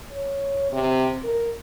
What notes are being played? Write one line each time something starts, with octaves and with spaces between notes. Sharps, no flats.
C#5
C3
A#4